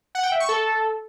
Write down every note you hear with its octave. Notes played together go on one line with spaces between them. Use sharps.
F#5
G5
E5
C#6
A4